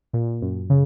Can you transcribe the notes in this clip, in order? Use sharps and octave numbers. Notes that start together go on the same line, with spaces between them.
A#2
F#2
C#3